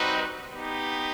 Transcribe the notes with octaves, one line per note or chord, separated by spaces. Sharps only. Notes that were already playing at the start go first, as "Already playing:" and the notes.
Already playing: G3 C4 D#4 F#4 B4
B3 D#4 G4